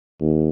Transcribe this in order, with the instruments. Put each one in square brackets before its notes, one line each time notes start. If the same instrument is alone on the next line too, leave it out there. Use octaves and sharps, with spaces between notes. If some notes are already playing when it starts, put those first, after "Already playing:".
[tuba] D#2